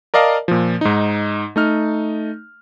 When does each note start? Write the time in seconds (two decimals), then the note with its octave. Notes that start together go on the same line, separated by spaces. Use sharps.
0.14 A#4 D5 D#5 F5 A5
0.48 A#2 F3
0.81 G#2 D#4
1.56 A3 D#4 F6